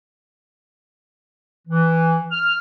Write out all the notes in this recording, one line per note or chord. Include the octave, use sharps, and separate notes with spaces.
E3
F6